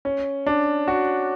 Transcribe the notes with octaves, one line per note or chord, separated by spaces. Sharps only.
C#4
D4
F#4